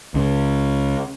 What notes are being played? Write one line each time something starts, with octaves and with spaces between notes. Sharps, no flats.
C#2 C#3